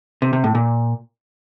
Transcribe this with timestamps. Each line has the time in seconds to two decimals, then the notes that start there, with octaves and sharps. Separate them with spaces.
0.22 C3
0.33 C3
0.44 A2
0.55 A#2